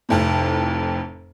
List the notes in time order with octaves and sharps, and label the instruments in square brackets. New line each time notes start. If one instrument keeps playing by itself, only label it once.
[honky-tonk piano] F1 F2 A2